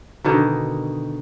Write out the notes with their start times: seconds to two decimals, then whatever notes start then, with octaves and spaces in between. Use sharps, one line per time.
0.24 B2 D3 D#3